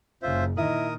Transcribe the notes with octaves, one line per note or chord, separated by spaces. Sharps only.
F#1 C#3 F4 C5 E5
A#2 D#3 E4 A#4 D#5 D#6